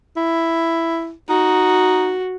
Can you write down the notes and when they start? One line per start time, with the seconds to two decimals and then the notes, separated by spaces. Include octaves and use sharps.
0.16 E4
1.29 D#4 F#4